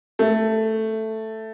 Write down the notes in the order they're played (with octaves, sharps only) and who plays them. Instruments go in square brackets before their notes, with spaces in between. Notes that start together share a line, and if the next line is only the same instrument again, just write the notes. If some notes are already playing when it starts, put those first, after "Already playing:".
[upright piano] A3